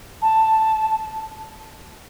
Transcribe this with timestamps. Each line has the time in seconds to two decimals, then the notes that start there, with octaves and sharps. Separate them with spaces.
0.22 A5